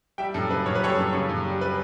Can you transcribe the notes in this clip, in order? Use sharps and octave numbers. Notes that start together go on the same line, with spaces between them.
G3 E5 G5
F#2 A4
C#3 B4
F#2 C#5
B4
G3 A4 C#5
F#2
C#3 A4 C#5
F#2
G3
B4